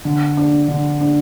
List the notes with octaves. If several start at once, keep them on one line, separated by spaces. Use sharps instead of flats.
D3
D4
D3
D4